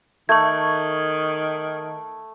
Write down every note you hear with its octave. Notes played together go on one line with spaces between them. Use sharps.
D#3 A3 C#6 G#6